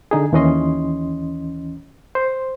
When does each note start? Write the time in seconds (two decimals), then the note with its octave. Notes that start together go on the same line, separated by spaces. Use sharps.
0.11 D3 D#4 G#4
0.33 D#2 E3 C#4 D#5 C6
2.15 C5